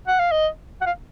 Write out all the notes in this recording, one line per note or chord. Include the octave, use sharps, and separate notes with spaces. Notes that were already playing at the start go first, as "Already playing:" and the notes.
F#5
F5
D#5
F#5
F5